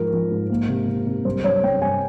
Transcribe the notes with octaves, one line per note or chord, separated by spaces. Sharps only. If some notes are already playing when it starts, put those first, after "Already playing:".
Already playing: G#2 F3 A#4
F3
G#2
A#3
C3
C3
C3
G2 C5
G2 C#5
G3 G5
G2 G#5